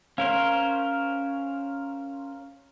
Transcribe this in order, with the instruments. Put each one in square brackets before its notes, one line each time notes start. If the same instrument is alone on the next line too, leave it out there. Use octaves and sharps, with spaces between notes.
[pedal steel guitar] C#4 A#4 C5 [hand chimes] F5